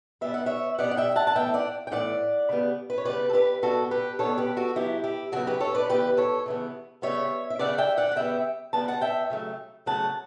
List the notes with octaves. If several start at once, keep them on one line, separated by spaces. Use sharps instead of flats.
B2 G3 B3 E5
F#5
C#5 E5
B2 G3 B3 D5 F#5
F#5
E5 G5
G5
F#5 A5
A5
A2 E3 B3 E5 G5
D5 F#5
G5
A2 E3 B3 D5 F#5
C#3 G3 B3
B4
C#5
C#3 G3 B3 B4 D5
A4
G4 B4
B2 G3 B3 F#4 A4
G4 B4
B2 G3 B3 A4 C#5
G4 B4
F#4 A4
C#3 F#3 B3 E4 G4
E4 G4
C#3 F#3 B3 F#4 A4
G4 B4
A4 C#5
B4 D5
C#3 E3 B3 G4 B4
A4 C#5
C#3 E3 B3
C#3 G3 B3 C#5 E5
E5
C#3 G3 B3 D5 F#5
E5 G5
D5 F#5
F#5
C#3 G3 B3 E5 G5
C#3 G3 B3 A5
F#5 A5
E5 G5
C#3 F#3 A3
C#3 F#3 A3 F#5 A5